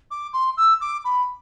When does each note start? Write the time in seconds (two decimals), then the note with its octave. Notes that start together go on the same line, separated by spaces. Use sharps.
0.11 D6
0.33 C6
0.57 E6
0.81 D6
1.04 B5